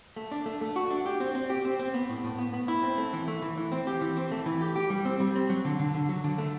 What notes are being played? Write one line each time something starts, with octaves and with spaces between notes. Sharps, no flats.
A3
D4
A3
A3
F#4
D4
G4
C4
C4
G4
C4
C4
B3
A2
A2
B3
B3
E4
C4
A3
E3
A3
E3
E3
C4
G4
E3
C4
A3
E3
G4
G4
G3
C4
G3
C4
F#3
D3
D3
D3
F#3
D3
A3